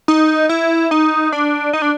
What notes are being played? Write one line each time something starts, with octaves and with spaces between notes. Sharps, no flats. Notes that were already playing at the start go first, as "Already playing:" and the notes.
D#4
E4
D#4
D4
D#4
D4